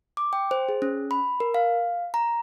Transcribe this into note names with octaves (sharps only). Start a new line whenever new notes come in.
D6
G5
C5
G#4
C#4
B5
A#4
F5
A#5